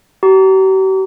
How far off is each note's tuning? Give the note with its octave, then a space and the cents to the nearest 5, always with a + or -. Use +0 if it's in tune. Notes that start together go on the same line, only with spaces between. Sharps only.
G4 -45 A#5 -10